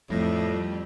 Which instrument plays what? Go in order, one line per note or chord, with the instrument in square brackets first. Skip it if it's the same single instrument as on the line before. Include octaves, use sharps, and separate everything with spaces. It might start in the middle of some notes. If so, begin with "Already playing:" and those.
[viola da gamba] F2 [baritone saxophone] A2 [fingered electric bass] F3 [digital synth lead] G3